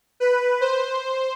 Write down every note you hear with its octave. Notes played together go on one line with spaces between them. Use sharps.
B4
C5